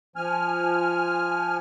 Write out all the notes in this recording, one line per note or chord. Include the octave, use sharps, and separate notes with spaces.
F3 G#5 F6